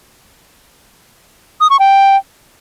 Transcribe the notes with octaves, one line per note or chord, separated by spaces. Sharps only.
D#6
C#6
G5